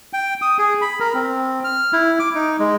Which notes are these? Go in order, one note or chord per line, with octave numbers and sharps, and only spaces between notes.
G5
D#6
G#4
B5
A#4
C4
F6
E4
D6
D#4
G#3